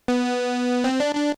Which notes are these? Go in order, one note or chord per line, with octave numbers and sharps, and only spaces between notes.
B3
C4
D4
D4